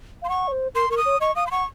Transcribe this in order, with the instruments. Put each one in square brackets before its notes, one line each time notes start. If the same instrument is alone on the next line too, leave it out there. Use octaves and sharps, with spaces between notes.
[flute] F5
[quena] C6
[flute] F#5 [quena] C#6
[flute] C#5
C5
[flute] A#4 [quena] C6
[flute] A#4 [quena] C#6
[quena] D#6
[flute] C#5
[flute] D#5 [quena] C#6
[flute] F5 [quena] D#6
[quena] C6
[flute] F#5 [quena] C#6